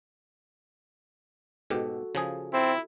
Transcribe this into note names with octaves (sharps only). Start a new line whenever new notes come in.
G#2 B2 F#4 G4 A4
C#3 F3 F4 G#4
C4 E4